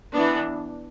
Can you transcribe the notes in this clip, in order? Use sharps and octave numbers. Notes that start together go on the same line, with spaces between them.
E3 B3 D4